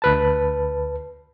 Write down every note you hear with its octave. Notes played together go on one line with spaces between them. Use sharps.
D2 B4 A5